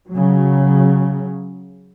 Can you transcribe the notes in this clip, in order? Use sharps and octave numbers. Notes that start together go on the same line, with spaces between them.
C#3 F#3